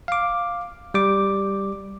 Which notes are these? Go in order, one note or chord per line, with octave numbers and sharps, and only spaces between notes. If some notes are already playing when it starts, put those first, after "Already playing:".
F5 D6
G3 D6